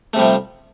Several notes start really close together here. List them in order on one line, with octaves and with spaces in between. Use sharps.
A3 C3 G3 F3